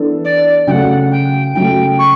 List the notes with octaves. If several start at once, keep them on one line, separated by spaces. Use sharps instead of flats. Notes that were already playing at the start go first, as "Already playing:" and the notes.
Already playing: E3 B3 D4 A4
D5
C#3 F#3 A3 F#5 G5
G5
C#3 F#3 A3 G5
C#6